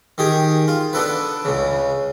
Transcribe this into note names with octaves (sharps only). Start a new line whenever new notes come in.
D#3 G4 G#4
F4
B3 D4 A4 B4
C#2 C#3